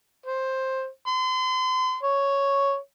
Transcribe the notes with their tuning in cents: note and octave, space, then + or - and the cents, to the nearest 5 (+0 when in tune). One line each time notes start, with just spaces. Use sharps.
C5 +10
C6 -35
C#5 +0